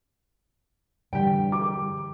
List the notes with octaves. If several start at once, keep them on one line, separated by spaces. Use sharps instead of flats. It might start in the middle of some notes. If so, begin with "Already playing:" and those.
G2 D3 E3 G3 G4 G5
D6